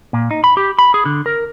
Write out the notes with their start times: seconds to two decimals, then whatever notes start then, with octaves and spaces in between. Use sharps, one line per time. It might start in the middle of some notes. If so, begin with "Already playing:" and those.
0.13 A#2
0.31 D#4
0.44 B5
0.57 G4
0.79 B5
0.94 G#4
1.06 D3
1.26 A#4